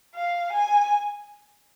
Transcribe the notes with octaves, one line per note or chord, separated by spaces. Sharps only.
F5
G#5